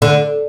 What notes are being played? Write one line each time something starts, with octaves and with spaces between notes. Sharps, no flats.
D3